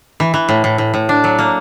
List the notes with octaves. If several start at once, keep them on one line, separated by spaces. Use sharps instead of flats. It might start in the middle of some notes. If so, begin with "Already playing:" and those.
E3
E3
A2
A2
A2
A2
D4
F#3
A#3